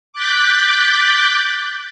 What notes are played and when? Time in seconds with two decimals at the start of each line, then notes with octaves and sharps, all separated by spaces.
0.13 D6 F#6 G6 A6 B6